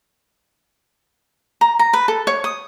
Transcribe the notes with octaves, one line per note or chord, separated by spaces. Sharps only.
A#5
A#5
B4
A4
C#5
D#6